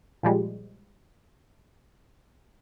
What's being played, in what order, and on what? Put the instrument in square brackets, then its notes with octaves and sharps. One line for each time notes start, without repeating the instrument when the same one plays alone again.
[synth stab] A#2 F3 G3 G#3